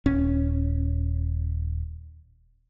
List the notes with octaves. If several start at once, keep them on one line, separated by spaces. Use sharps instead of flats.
D#1 C#4